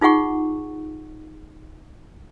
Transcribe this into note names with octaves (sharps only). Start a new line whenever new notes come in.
D#4 F4 G#4 F#5 C#6